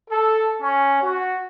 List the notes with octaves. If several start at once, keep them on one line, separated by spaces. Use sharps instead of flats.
A4
C#4
F#4